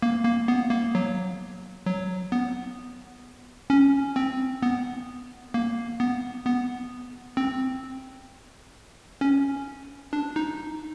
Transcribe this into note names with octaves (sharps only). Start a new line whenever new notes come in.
A#3
A#3
B3
A#3
F#3
F#3
B3
C#4
C4
B3
A#3
B3
B3
C4
C#4
D4
D#4